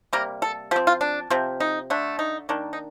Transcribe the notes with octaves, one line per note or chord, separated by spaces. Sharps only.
C3 G3 A#3 A#4
A4
F3 C4 G4
F4
D4
C3 F3 C4
D#4
D3 A3 D4
D#4
D#3 A#3 D4
D#4